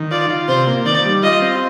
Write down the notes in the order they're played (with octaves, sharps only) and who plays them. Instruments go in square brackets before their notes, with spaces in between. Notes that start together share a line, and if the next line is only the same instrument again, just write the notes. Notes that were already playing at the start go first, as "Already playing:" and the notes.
Already playing: [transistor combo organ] D#3
[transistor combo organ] F4 [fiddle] D5
[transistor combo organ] F4
[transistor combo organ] C3 [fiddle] C5
[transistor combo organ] A#3
[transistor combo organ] D#3 [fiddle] D5
[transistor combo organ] G3
[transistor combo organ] F4 [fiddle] D#5
[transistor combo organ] C4